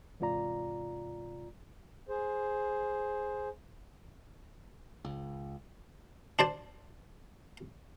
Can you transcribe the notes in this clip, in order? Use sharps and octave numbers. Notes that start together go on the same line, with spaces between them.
E2 G#2 C3 F4 D5 A#5
G#4 C5
C#2
D4 C5 D5